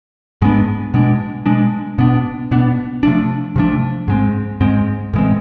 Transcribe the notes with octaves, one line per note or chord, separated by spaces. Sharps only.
G#2 G#3 B3 D4
B2 G#3 D4
B2 G#3 D4
B2 B3 D4
B2 B3 D4
C3 F3 A3 D4
C3 F3 A3 D4
G#2 G#3 C4
G#2 G#3 C4
A2 E3 G#3 C4